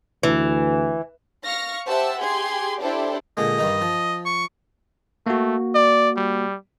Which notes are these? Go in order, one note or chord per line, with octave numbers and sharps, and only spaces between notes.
D2 E3
F5 C#6 F6 A#6
G4 C5 E5 F#5 A5 E6
G4 G#4 C6 G#6
D4 E4 G4 A4 C5 D5
A#2 D3 G#3 D#5
G2 D#3 D#4
F3
C#6
A3 A#3 F#4
D5
G3